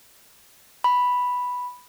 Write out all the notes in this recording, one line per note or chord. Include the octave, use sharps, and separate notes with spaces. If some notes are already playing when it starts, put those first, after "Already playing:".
B5